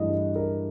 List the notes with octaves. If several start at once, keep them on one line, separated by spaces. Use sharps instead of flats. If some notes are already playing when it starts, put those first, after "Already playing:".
Already playing: G2 E3 A3 D#5
A#4